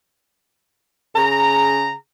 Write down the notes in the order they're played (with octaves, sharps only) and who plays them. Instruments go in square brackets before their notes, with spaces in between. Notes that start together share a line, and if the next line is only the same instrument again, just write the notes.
[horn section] C#3 G#4 A#5